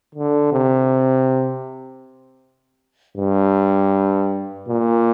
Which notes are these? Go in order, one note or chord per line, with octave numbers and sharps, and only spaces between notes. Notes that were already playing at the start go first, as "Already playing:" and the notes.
D3
C3
G2
A#2